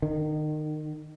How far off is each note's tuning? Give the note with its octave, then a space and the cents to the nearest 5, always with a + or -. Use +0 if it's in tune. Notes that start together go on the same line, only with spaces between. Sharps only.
D#3 -30